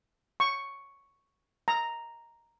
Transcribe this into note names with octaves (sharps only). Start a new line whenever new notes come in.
C#6
A#5